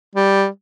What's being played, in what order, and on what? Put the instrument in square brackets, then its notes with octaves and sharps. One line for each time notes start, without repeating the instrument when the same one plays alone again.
[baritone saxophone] G3